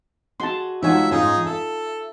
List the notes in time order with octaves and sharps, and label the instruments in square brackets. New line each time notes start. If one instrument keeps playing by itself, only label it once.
[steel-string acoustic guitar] F#4 G#4 D#5 [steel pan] A5 C6
[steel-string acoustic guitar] F3 G#3 F#4 [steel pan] D#4 C#5 G#5 [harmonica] E5
[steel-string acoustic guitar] G#2 F3 C#4 [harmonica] D#4 G#4 [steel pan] F4
[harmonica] A4 [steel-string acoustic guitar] E5